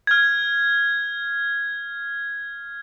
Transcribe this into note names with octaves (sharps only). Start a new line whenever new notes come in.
F6 G#6